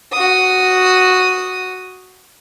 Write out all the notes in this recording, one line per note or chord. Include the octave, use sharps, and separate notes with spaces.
F#4 D#6